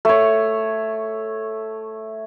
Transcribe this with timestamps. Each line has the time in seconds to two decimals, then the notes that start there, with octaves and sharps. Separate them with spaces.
0.05 A3 C#5